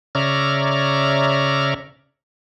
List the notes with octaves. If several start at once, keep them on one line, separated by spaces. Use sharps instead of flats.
C#3 C#5 D5 E5 A#5 F6